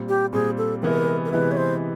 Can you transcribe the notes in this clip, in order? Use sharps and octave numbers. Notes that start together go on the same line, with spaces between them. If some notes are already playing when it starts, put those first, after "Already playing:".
Already playing: A#2 G3 C4
G4
A#2 G3 C4 G#4
A4
C3 E3 G#3 B3 E4 A#4
A#4
C3 E3 G#3 B3 E4 B4
C#5
C5